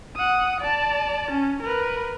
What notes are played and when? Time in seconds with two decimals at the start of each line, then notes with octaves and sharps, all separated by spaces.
0.15 F#5 D#6
0.61 D5 A5
1.31 C#4
1.62 A#4 B4